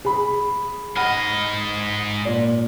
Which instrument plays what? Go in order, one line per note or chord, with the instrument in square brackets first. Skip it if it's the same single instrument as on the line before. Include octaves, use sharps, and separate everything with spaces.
[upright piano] G#4 B5
[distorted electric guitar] G#2 D#5 [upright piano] F#5 B5 F6
[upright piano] A#2 D5